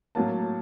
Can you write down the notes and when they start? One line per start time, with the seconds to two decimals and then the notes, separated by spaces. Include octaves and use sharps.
0.15 A2 F#3 A#3 A5